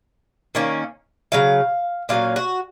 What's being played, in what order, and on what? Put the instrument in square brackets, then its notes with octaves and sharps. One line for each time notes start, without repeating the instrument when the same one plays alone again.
[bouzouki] D#3 A#3 C#4
C#3 F#3 F5
A#2 F#3 C#4 F5
F#4